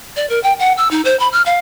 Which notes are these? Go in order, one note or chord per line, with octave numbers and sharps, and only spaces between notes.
D5
A#4
G5
F#5
E6
D#4
C5
B5
F6
F5